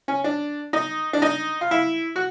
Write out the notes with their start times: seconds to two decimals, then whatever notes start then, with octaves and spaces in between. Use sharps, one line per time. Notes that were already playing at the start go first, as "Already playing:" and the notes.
0.08 C#4
0.24 D4
0.73 D#4
1.13 D4
1.22 D#4
1.61 F4
1.71 E4
2.16 F#4